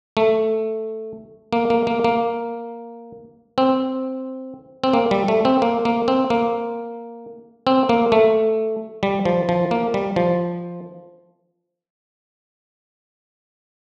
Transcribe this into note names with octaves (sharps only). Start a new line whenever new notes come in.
A3
A#3
A#3
A#3
A#3
C4
C4
A#3
G3
A3
C4
A#3
A#3
C4
A#3
C4
A#3
A3
G3
F3
F3
A#3
G3
F3